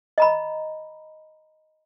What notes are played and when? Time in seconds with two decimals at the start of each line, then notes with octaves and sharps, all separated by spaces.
0.18 D#5 A#5 B5